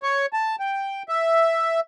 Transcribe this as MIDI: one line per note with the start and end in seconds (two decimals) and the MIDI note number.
0.03 0.26 73
0.33 0.56 81
0.60 1.03 79
1.09 1.80 76